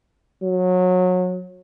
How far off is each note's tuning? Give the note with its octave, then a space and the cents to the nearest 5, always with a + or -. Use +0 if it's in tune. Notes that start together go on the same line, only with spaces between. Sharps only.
F#3 -25